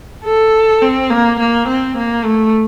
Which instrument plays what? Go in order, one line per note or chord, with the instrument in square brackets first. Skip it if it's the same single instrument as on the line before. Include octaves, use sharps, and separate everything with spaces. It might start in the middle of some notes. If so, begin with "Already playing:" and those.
[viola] A4
C4
A#3
A#3
C4
A#3
A3